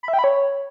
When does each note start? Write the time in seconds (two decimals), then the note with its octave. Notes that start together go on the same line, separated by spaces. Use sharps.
0.03 B5
0.08 E5
0.13 G5
0.19 B5
0.24 C#5